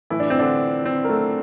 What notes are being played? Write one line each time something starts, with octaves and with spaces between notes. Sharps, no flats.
A2 E3 E4
D4
C4
D3 D4
C4
A#4
A3 A4